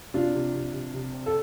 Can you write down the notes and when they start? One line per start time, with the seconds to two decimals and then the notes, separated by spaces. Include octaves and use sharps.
0.14 C3 D4 F4
0.34 C3
0.54 C3
0.73 C3
0.94 C3
1.13 C4
1.26 A4